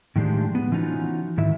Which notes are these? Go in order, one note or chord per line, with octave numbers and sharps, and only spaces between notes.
A2 D#3 F3 G#3 D4 G4
B3
E3 F3 C#4 D#4 F4 F#4
G#2 D#3 E4 E5